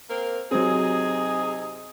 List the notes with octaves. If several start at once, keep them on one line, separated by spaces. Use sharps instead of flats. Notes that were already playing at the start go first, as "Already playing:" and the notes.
A#3 C4 A#4
C3 F#3 C4 D#4 G#4